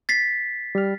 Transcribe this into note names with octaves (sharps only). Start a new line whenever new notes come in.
A6 B6 C7
G3 F6